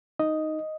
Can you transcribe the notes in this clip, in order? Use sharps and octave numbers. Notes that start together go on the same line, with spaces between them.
D#4 D#5